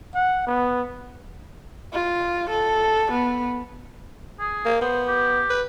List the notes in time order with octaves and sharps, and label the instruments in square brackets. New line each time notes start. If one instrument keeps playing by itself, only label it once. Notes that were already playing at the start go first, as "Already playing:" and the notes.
[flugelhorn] F#5
B3
[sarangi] F4
A4
B3
[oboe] G#4
[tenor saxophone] A#3
[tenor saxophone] B3 [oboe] C5
[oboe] G4
[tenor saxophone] B4